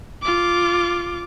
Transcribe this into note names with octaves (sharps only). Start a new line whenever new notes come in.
F4 D6